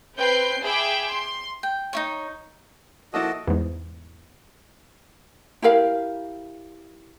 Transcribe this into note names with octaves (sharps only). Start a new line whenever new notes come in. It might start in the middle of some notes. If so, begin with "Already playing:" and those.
C4 B4 G5 G6 C7
G#4 E5 G5 B5 D6
C6
G5
D#4 E4 C#5
F3 A#3 E4 F#4 A4 D#5
E2 G#2
E4 G4 A#4 F5